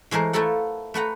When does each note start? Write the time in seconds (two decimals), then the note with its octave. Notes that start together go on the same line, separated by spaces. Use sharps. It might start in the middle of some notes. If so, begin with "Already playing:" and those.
0.11 E3 G#3 A3 A#4 C5
0.33 A3 E4 F4 A4 A#4 F#5
0.94 A3 B4 F#5 A#5